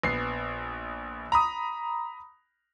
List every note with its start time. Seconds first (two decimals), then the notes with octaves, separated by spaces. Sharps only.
0.03 A#1 B3 C7
1.32 A#5 B5 D#6